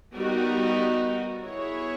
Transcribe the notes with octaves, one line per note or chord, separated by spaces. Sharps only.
G3 B3 D#4 F#4 A#4
B3 E4 G#4 C#5